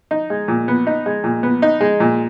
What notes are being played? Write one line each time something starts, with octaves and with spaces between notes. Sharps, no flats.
D#4
G#3
A#2
B3
D#4
G#3
A#2
B3
D#4
G#3
A#2